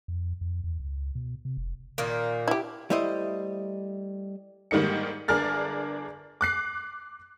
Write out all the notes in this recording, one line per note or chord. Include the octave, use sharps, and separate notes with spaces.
F2
F2
E2
C#2
B2
C3
F1
A#2 D#3 A#3
E4 G4
G3 A3 E4 C5 D#5
G#2 D#3 G3 A#3 D#4 C#7
G1 D4 G#4 A#4 F6 A6
D6 F#6 C7